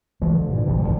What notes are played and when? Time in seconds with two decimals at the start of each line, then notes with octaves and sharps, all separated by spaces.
0.22 E3 F3 G#3 A3
0.34 D3 F3
0.49 G2 A#2
0.66 G#1 A2 C3 E3
0.80 D#1 C2 D3 F3